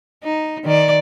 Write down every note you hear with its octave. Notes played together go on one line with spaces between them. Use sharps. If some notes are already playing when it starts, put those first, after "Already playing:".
D#4
D#3 D5